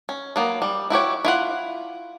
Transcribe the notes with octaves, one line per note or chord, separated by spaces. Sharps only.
C#4
F#3 A#3 B3
G3
E4 F#4 G4 C#5
E4 F4 F#5